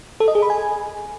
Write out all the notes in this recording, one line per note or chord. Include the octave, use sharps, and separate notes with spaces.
A4
D#5
G#4
B5
G#5